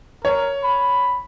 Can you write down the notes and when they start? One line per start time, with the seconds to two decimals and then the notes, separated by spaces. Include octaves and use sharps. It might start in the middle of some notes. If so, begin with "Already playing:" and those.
0.25 A#4 C#5
0.64 B5